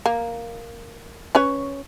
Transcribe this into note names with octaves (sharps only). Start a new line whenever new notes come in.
A#3
C#4 B4 C#5